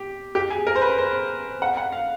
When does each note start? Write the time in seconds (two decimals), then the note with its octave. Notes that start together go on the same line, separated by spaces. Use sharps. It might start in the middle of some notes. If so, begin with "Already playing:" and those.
Already playing: G4
0.35 G4
0.50 G#4
0.67 A#4
0.76 C5
0.82 B4
0.98 C5
1.62 F#5
1.77 F#5
1.92 F5